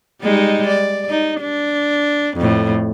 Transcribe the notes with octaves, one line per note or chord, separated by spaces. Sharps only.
G3 G#3 D#4
D5
D#4
D4
F2 A2